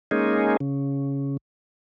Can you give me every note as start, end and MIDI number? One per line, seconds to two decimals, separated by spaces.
0.11 0.57 56
0.11 0.57 58
0.11 0.57 61
0.11 0.57 63
0.11 0.57 68
0.60 1.37 49